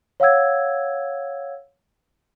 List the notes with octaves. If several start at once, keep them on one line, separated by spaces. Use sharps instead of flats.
C#5 F5 F#5 E6 G#6